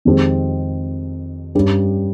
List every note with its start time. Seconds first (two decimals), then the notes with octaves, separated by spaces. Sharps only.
0.05 F2 D#3 G#3 C4 G4
1.55 G2 G3 C#4 G4